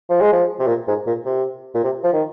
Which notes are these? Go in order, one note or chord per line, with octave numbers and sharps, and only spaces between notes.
F3
G#3
F3
C3
A#2
G#2
A#2
C3
A#2
C3
F3
D#3